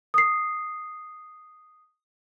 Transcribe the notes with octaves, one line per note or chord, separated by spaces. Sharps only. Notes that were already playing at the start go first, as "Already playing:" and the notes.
D#6 C7